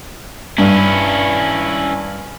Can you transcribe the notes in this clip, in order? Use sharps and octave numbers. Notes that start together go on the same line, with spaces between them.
G2 C#4 E4